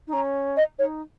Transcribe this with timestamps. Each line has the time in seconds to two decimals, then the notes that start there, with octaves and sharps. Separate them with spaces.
0.07 D#4
0.12 C#4 A#5
0.56 D#5
0.78 D#4 C#5